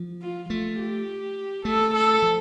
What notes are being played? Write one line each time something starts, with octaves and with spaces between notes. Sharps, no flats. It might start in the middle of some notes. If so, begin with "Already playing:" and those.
Already playing: F3
F4
A3 F4
G4
A3 A4
A4
F3